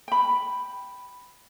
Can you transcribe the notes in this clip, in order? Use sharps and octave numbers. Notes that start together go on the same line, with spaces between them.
G5 B5